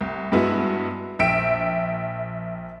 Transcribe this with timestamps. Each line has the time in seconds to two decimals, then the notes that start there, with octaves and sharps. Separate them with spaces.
0.01 C2
0.32 G2 G#3 B3 E4 F#4
1.19 A#1 E5 G5 D7